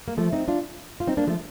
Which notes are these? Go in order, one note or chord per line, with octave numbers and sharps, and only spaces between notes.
A#3
F3 A3
C4 D#4
D4 F4
F4
C4 D#4
A#3 D4
F3 A3